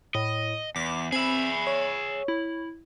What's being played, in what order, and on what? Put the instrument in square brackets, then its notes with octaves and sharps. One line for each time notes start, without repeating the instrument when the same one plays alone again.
[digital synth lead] A2 [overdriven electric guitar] D#5
[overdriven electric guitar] E2 [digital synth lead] D6
[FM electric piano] C4 [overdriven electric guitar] G#4 E5 [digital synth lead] B5
[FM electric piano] C#5
[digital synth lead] E4